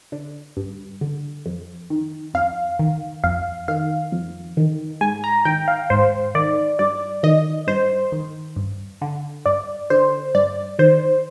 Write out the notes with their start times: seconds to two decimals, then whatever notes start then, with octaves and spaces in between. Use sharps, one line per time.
0.12 D3
0.57 G2
1.01 D3
1.46 F2
1.90 D#3
2.34 F2 F5
2.79 D#3
3.24 F2 F5
3.68 D#3 F5
4.12 F2
4.57 D#3
5.01 G#2 G#5
5.24 A#5
5.45 D#3 G5
5.68 F5
5.90 G#2 C5
6.35 D#3 D5
6.79 G2 D5
7.23 D#3 D#5
7.67 G2 C5
8.12 D#3
8.56 G2
9.01 D3
9.46 G2 D5
9.90 D3 C5
10.35 G2 D5
10.79 D#3 C5